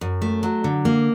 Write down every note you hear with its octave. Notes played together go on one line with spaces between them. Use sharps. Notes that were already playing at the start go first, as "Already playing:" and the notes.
F#2
A3
F#3
D3
A#3